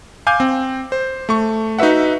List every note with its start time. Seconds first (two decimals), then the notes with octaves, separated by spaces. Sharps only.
0.27 F5 G#5 D6 G6
0.40 C4
0.92 C5
1.29 A3 C#6
1.78 D#4 F#4 B4 E5 F#5